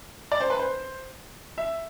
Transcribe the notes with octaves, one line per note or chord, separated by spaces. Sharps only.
D5
C5
B4
C5
E5